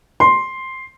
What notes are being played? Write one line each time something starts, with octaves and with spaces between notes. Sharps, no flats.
C6